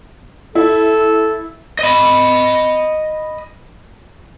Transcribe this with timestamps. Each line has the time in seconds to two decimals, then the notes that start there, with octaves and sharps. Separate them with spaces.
0.55 E4 A4
1.79 D#5 B5